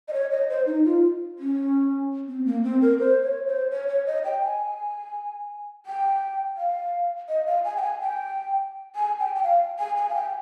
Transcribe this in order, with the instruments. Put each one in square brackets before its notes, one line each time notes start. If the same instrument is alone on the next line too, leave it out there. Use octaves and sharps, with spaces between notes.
[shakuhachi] D#5
C#5
D#5
C5
D#4
F4
C#4
C4
A#3
C4
A#4
C5
C#5
C5
C#5
C#5
D#5
G5
G#5
G5
F5
D#5
F5
G#5
G5
G#5
G5
G#5
G5
G5
F5
G#5
G#5
F5
G5